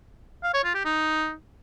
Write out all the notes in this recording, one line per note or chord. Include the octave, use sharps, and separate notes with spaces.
F5
C#5
F4
G4
D#4